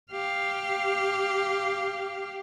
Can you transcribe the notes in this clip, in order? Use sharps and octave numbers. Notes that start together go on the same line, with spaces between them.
G4 F5